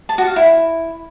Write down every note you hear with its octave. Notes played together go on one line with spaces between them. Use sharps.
A5
F#4
F5
E4